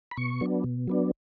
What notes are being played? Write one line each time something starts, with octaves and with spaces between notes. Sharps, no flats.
B5
B2 C#6
F#3 B3 D4
B2
F#3 B3 D4